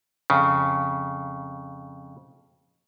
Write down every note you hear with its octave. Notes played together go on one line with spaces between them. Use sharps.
F2 C#3